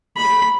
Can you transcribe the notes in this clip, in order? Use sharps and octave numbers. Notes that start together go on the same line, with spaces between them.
B5